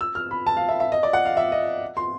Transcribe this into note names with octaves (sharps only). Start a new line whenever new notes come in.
E6
F6
B5
A5
F5
E5
E5
D#5
D5
F#5
F5
E5
D#5
C6